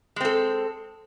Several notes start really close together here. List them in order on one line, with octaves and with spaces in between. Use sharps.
G#3 C4 A4